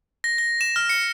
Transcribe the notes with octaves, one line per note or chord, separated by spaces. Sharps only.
A#6
A#6
E7
F6
C#7